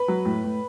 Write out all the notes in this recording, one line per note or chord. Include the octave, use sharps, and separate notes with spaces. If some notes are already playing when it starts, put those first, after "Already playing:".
Already playing: B4
F#3
A2
A2